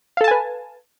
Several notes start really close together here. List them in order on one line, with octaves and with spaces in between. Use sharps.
F5 A4 A5 G#5 B4